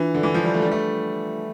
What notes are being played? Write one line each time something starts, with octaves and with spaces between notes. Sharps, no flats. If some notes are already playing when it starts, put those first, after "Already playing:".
Already playing: E3 D4 F4 B4
D3
E3
F3
G3
A3
G3
A3